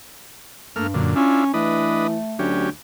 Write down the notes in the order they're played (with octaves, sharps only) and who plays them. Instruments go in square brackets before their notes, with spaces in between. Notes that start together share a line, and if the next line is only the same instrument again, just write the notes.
[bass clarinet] G2 [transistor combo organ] A3 A#3 F6
[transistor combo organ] F#2 A#2 D3
[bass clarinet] C#4 [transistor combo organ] D4 E4 F4
[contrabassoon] E3 [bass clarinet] A3 [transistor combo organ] D4 B4 D#5
[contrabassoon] D2 [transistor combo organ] F#3 C#4 G4